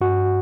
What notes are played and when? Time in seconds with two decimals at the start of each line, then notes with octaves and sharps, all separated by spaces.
0.01 G2 F#4